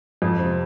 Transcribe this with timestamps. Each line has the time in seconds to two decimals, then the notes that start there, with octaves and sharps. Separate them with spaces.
0.22 F2
0.39 C3 F3